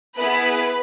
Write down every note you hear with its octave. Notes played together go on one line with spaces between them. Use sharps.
B3 E4 G#4 B4 B5